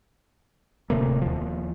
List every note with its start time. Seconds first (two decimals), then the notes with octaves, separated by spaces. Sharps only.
0.90 D1 C3 A3 A#3
1.22 D#2 F3